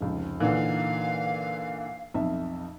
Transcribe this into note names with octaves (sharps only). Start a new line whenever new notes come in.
F1 C#2
A#2 D3 E3 D#4 F5
B1 F2 E5